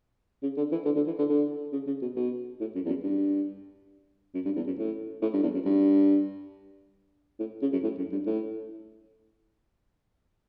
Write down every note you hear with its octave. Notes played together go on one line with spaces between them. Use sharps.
C#3
D3
E3
D3
D3
E3
D3
D3
C#3
C#3
B2
B2
A2
F#2
E2
F#2
G2
F#2
G2
E2
F#2
A2
A2
G2
E2
F#2
G2
A2
C#3
F#2
A2
F#2
G2
A2